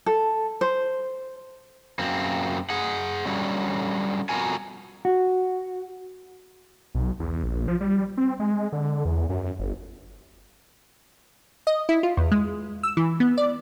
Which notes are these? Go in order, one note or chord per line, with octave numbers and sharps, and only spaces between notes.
A4
C5
F#2 A#3 C4
G#4 F#5
D3 F#3 G3 C#4
F2 B2 F#4 A#4 G#5
F#4
B1
E2
A#1
F3
G3
C4
G#3
D3
E2
F#2
G1
D#5
E4
F4
E2
G#3
E6
E3
B3
D5